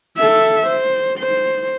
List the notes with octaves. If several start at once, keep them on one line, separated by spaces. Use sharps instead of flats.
A4 E5
C5
C5